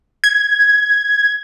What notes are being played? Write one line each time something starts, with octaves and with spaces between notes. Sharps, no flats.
G#6